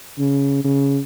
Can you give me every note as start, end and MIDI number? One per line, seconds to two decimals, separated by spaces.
0.19 0.62 49
0.64 0.99 49